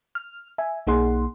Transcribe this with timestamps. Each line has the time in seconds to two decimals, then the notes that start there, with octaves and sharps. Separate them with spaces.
0.15 F6
0.58 E5 G#5
0.87 B1 A#3 D#4 G#4 F#5 C6